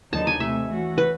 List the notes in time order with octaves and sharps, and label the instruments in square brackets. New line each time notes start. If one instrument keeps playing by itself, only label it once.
[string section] D#2 D3 F#3 B3 D#4 [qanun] A5
[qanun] G#5
[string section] C3 E3 A3 [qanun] E5
[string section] E3 A3 C#4 F#4
[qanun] B4